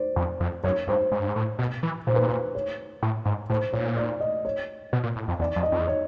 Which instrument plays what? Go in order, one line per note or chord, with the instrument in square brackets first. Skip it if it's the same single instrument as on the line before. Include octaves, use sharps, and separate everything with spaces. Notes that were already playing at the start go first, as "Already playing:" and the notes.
Already playing: [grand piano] C5 D5
[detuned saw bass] F2
F2
[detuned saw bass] F#2 [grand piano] C#5
[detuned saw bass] G2 [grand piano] C5
[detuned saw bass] G#2
G2
G#2
A2
B2
E3
[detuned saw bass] A#2 [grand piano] C5
[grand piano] B4
C5
C#5
[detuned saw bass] A2
G#2
[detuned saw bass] A2 [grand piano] C5
[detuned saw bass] A#2 [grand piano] C#5
[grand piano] D5
D#5
C#5
[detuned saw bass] B2
A#2
A2
F2
[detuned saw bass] E2 [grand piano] D5
[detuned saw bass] F2
[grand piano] D#5
[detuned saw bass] F2
E2
[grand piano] C#5